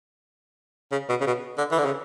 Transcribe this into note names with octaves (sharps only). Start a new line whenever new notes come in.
C#3
B2
C#3
B2
D3
E3
D3
C#3